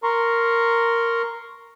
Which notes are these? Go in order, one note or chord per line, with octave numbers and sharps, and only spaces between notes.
A#4 A#5 C6 C#6